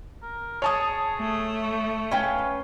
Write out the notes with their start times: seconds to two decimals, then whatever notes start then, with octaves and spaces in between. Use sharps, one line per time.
0.22 A#4
0.62 G#4 C#5 A5 D#6
1.19 A3
1.62 C#6
2.12 C#4 B4 F5 G5